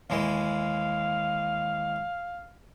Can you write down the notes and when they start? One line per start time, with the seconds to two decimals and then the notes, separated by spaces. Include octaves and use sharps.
0.10 D#2 E3 G#3 F5